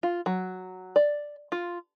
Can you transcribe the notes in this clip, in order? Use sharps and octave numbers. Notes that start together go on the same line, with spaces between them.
F4
F#3
D5
F4